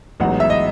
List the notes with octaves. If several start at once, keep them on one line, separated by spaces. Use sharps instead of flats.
A1 G#2 F#3 B3 D#4 F#5
E5
D#5